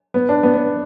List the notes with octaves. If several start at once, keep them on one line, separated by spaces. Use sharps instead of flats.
B3
D4
B3
B3